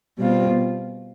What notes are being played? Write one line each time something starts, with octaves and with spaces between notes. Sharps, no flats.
B2 G3 C4 F4